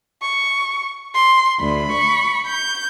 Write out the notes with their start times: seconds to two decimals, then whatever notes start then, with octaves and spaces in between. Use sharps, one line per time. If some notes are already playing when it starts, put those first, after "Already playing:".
0.22 C#6
1.14 C6
1.60 D2 B5
1.92 C#6
2.47 G6